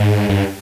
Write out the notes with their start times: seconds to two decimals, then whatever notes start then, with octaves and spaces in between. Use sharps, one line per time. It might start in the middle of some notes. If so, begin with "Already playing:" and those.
Already playing: G#2
0.29 G2